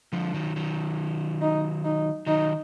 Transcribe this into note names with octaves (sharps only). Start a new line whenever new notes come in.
D3 F3
D#3 F#3
D#3 F#3
D#4
D#4
D#3 F#3 D#4